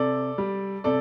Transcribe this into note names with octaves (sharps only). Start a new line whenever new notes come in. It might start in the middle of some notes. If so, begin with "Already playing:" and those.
Already playing: C3 A4 D5
G3
C3 A4 D5